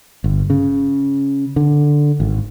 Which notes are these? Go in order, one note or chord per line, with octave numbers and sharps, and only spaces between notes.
G1
C#3
D3
G#1